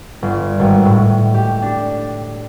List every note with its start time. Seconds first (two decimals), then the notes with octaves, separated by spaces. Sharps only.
0.22 G1
0.60 G#1
0.85 A2
1.34 G4
1.62 D4